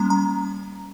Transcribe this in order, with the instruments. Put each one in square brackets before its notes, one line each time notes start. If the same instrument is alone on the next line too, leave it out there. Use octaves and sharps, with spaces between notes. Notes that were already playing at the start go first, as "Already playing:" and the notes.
Already playing: [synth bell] G3 A#3 C#4 A#5
A#5